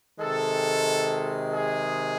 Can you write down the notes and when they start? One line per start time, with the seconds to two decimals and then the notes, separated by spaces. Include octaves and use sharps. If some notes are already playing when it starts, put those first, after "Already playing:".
0.19 C3 D#3 G#3 A4
1.54 G#4